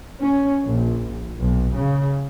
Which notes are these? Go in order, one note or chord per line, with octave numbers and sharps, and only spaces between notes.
C#4
A#1
B1
C#3